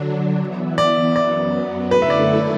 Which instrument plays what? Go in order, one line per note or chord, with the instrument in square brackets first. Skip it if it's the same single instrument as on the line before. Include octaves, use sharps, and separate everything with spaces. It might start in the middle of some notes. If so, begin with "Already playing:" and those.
Already playing: [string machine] D3 F#3 D4
E3 B3 E4
[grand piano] D5
[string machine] F#2 F#3 B3 [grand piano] D5
[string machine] F#2 D3 A3 E4 A4 [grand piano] B4
[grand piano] E5
D5